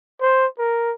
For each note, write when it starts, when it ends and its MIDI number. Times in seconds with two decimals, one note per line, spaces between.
0.21 0.47 72
0.59 0.92 70